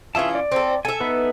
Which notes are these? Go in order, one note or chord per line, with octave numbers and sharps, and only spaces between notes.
E3 C#4 F4 G#4 E5 A5
D5
C4 A4
A4 E5 G#5
B3 D#4 B4